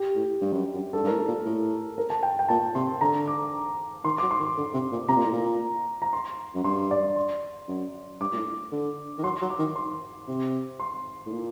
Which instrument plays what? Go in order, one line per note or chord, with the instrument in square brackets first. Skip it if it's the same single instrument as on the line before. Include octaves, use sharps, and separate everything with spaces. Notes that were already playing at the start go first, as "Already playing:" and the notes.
Already playing: [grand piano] G4
[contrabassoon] A2
G2
F#2
F#2
[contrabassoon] G2 [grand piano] A4
[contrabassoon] G2
[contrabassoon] A2 [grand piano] A#4
[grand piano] A4
[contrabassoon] A#2
A2
[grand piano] A#4
A5
G5
G5
[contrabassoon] A#2 [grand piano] A5
[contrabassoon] C3 [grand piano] C6
[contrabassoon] D3 [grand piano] A#5
[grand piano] D6
[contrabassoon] D#3 [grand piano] C6
[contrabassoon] F#3 [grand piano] D6
[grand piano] C6
[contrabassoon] D#3
D3
C3
A#2
[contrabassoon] C3 [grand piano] A#5
[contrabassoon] A#2
A2
A#2
[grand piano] A#5
C6
[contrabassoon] F#2
[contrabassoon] G2 [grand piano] C6
[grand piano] D5
C6
[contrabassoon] F#2
[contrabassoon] G2 [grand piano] D6
[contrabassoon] A#2
A2
D3
D#3
[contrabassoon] F#3 [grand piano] C6
[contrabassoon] F#3
[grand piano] D6
[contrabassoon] D#3
[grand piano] C6
[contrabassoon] C3
[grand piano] C6
[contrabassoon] A2
A#2